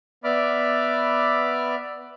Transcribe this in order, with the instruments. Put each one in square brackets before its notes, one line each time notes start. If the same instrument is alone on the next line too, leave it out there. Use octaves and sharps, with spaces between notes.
[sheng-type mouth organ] B3 D5 E5 B5 D6 F6